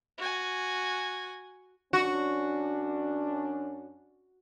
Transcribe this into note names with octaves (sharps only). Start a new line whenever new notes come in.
F#4 G#5
F#2 C#4 D4 F#4